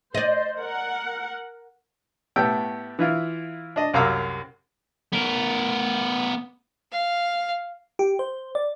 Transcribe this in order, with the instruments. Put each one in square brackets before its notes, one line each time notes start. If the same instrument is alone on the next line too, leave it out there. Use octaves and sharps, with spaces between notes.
[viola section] C5 [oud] D5 D#5
[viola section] A#4 F#5
[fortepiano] A2 A3 B3 G4 G5 E6
E3 E4 F4
D4 D#5
C2 F#2 F5 A#5 D6 E6
[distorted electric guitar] B3 A#4
[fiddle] F5
[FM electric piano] G4
C5
D5